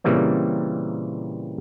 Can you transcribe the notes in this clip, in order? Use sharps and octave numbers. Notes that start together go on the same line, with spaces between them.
A#2 C#3 E3 G3 A#3 C4